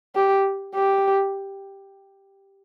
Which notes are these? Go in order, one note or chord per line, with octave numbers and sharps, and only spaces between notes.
G4
G4